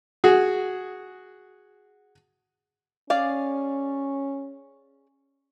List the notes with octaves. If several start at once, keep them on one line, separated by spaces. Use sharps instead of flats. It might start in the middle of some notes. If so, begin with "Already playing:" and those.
F#4 G#4
C#4 G#4 D5 F5